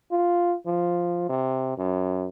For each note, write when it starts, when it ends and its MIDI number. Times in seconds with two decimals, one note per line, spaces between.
0.11 0.55 65
0.66 1.25 53
1.29 1.74 48
1.78 2.28 42